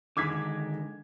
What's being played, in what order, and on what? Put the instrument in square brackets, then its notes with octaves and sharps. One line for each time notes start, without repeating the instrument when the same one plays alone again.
[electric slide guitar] D3 D#3 G#3 [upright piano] D6 G#6 B6